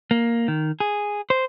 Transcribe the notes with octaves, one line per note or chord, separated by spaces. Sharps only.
A#3
D#3
G#4
C5